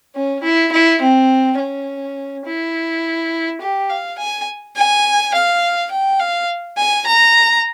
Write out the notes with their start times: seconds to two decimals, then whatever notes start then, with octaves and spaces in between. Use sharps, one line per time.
0.15 C#4
0.43 E4
0.72 E4
1.02 C4
1.58 C#4
2.46 E4
3.61 G4
3.89 F5
4.18 G#5
4.76 G#5
5.34 F5
5.91 G5
6.19 F5
6.77 G#5
7.06 A#5